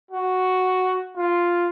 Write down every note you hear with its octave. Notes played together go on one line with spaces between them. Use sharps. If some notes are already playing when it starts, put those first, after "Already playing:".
F#4
F4